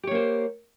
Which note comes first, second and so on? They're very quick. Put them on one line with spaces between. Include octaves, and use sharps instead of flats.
G4 C#5 A#3 C5